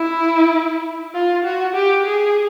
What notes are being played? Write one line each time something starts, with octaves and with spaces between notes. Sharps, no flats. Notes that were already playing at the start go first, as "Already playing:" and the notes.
Already playing: E4
F4
F#4
G4
G#4